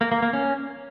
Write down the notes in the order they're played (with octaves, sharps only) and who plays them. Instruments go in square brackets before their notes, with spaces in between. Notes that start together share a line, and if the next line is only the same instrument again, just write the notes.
[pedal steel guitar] A#3
A#3
A#3
C#4